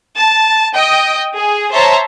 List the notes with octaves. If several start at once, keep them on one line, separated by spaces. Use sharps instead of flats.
A5
D#5 G5
G#4
C5 C#5 E5 A5 A#5